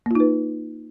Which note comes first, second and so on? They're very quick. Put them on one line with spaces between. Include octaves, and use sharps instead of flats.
A#3 F4 D#4 B4